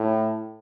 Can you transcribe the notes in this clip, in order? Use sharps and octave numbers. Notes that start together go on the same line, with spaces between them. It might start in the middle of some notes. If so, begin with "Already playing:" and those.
Already playing: A2